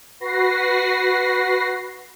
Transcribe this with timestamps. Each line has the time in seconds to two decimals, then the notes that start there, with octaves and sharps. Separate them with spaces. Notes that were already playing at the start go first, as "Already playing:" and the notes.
0.20 F#4 B4 A#6 C7